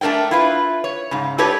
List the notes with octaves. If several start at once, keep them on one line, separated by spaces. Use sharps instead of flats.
A3 D4 A#4 D5 G5
E4 F4 B4
C#5
G#2 C#3
D4 G4 A4 B4 C#5 D#5